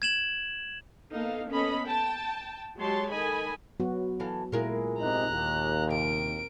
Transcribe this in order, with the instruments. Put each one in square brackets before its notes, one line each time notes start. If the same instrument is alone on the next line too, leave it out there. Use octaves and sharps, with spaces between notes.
[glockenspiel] G#6 E7 F#7
[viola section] A#3 B3 D#4 A4 F5
B3 C#4 A4 D#5 B5
G5 A5
F#3 G#3 G4 C#5 A5 C6
D#3 A4 D#5 G#5 B5
[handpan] F#3 B3 F#4
[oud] E3 A4 F5
[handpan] A#2 E4 [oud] G#3 A#4 F5
[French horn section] G#2 C3 D#4 [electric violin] A#5 F#6
[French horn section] D#2
[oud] C3 [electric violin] A#4 D7